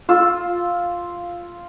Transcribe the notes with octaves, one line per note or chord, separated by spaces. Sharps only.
F4 E6